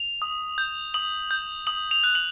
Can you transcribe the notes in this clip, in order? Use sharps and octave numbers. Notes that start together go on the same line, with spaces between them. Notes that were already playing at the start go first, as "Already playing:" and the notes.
Already playing: F7
D#6
G6
D#6 F#7
G6
D#6 F#7
F7
F#6
F#7